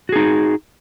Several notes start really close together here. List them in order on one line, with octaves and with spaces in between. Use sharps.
F#4 G#4 D#4